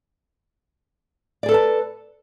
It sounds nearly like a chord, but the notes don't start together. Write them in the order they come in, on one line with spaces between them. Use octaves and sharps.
D5 G#4 A4 B4 A5